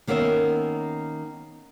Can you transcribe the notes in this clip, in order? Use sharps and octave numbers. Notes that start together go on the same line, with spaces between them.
D#3 A#3 B3 C#4 C#5 E5